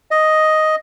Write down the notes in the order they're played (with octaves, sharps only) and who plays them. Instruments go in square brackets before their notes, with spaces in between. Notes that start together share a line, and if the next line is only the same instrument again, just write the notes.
[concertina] D#5